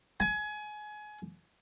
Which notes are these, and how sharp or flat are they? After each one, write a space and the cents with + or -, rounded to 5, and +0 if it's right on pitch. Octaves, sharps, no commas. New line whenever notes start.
G#5 +25